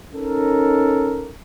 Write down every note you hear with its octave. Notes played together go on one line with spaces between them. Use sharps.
C#4 D#4 A4 A#4